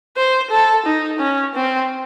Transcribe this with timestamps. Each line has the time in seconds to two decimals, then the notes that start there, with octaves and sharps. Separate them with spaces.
0.17 C5
0.51 A4
0.86 D#4
1.20 C#4
1.55 C4